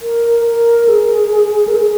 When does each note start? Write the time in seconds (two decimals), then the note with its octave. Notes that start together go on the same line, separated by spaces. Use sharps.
0.01 A#4
0.45 A#4
0.88 G#4
1.68 A#4
1.75 G#4